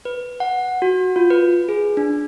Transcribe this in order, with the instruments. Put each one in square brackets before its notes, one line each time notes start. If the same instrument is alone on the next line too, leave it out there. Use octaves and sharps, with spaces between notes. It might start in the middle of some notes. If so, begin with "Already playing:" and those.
[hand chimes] B4
F#5
F#4
F4
B4
G#4
D4